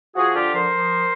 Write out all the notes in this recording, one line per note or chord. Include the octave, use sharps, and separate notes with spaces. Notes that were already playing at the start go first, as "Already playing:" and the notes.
F3 F#4 G#4
D3 F4 G4
F3 A#4 C5
F3